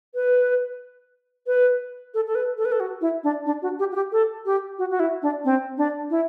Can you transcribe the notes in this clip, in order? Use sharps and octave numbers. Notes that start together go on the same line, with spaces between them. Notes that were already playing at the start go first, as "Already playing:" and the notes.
B4
B4
A4
A4
B4
A4
B4
A4
F#4
E4
D4
D4
F#4
G4
F#4
G4
A4
G4
F#4
F#4
E4
D4
C4
D4
E4